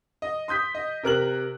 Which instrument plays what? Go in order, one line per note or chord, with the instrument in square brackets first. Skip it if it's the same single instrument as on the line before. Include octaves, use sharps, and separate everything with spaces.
[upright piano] D#5
C6 D#6 G6 B6
D#5
C3 A#4 F#6 F#7